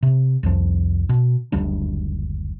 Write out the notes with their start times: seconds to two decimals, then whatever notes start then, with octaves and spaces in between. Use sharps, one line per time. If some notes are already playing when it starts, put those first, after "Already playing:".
0.03 C3
0.43 C2 F2 F3
1.09 B2
1.52 F#1 D2 G3 D4